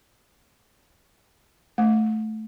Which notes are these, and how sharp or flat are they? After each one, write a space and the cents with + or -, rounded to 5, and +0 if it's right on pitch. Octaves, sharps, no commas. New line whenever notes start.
A3 -10